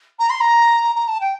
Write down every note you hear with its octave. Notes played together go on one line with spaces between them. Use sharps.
A#5
C6
A#5
A#5
A5
G5